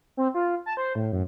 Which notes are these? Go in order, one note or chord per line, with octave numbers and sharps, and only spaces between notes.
C4
F4
A5
C5
A2
F#2